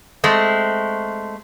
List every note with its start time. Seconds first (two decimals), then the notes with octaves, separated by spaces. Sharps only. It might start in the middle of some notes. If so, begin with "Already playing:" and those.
0.24 G#3 A3 C4